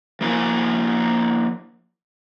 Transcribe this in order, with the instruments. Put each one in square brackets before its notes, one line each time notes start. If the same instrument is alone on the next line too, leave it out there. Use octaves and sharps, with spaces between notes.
[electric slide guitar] F3 A#3 E4 G#5